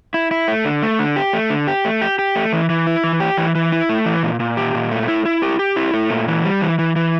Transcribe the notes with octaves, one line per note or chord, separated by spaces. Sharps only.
E4
E4
A3
D3
A3
D3
G4
A3
D3
G4
A3
G4
G4
A3
E3
E3
E4
E3
G4
E3
E3
E4
A3
E3
A#2
A#2
G4
A#2
A3
E4
E4
G4
G4
E4
A3
A#2
E3
G3
E3
E3
E3